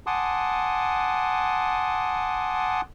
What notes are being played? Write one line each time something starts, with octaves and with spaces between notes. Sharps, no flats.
F#5 G#5 A5 C6 D6 D#6